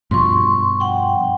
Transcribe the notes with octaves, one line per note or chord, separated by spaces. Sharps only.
G2 B2 F3 C6 C#6
F#5 G5